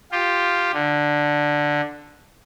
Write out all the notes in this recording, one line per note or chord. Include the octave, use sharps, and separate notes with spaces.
F4 G4
D3